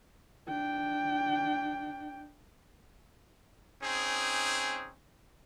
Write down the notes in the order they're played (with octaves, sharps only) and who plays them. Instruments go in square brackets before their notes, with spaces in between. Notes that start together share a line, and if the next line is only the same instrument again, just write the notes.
[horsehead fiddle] D4 G5
[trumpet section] C4 C#4 D#4 G#4